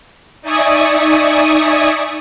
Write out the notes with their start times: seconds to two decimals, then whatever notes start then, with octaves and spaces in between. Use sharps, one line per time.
0.42 D#4 D5 E5 G#5 C#6 D#6